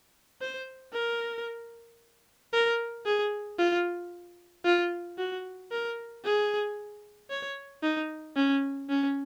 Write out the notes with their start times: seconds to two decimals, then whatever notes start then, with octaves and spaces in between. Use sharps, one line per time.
0.41 C5
0.94 A#4
2.53 A#4
3.06 G#4
3.59 F4
4.65 F4
5.18 F#4
5.72 A#4
6.25 G#4
7.30 C#5
7.83 D#4
8.36 C#4
8.89 C#4